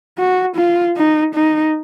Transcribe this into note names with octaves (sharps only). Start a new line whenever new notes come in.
F#4
F4
D#4
D#4